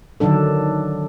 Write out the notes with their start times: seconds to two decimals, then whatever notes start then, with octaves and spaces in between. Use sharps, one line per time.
0.20 D3 D#3 F#3 D4 A4